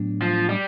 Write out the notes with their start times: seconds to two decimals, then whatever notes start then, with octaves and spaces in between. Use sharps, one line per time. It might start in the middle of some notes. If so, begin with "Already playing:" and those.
Already playing: A2 F#3 B3 D4
0.22 F3
0.49 G3